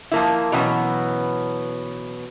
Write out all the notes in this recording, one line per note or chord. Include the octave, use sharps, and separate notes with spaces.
F3 A#3 E4
B2 E3 F#3 B3 C#4